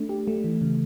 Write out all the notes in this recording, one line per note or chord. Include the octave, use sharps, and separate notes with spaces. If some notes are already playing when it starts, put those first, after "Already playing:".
Already playing: A3 D4
G4
A3
E3
C#3